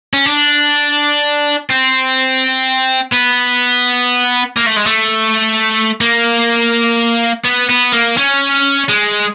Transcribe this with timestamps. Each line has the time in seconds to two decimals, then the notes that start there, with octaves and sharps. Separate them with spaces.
0.13 C#4
0.26 D4
1.70 C4
3.13 B3
4.57 A#3
4.67 A3
4.77 G#3
4.86 A3
6.01 A#3
7.45 B3
7.70 B3
7.92 A#3
8.17 C#4
8.89 G#3